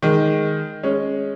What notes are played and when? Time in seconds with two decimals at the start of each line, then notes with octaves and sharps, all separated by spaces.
0.02 D#3 G#3
0.83 G#3 C#4